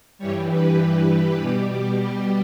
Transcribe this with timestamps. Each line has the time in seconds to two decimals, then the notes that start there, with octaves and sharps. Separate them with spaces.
0.19 G2 E3 G3 C#5
0.50 B4
0.80 B4
1.41 B2 G3 G4
2.03 G4